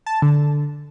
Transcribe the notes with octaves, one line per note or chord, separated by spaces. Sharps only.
A5
D3